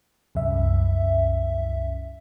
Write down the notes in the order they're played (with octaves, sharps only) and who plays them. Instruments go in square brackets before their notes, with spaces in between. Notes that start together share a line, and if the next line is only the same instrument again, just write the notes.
[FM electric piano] C2 F#2 E5